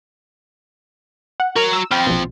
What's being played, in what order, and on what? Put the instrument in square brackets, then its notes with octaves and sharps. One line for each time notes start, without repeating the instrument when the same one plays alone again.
[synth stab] F#5
[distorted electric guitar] F#4 A#5 [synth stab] A#4
[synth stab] E6
[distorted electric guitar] C4 F4 [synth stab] G5 B5 F6
[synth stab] A#1 B2